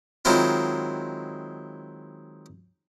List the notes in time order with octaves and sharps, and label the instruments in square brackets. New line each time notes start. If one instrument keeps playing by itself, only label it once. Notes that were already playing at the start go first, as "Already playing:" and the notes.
[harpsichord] D#3 F#3 G#3 C4 E4 F4